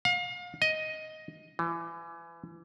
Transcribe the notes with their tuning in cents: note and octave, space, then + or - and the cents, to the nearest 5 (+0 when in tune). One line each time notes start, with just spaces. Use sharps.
F5 +35
D#5 +10
E3 +30